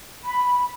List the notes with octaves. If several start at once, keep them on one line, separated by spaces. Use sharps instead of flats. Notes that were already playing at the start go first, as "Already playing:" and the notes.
B5